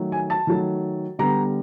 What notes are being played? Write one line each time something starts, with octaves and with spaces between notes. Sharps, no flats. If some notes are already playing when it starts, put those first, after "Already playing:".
Already playing: D#3 F#3 A3
G#5
A5
D#3 F#3 A3
D3 G3 B3 A#5